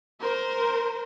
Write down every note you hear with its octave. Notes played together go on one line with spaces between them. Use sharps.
A#4 C5